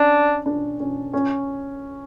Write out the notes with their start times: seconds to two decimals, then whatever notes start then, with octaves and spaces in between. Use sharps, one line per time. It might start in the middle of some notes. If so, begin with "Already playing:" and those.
Already playing: C#4 D4
0.46 D4
0.80 C#4
1.13 C#4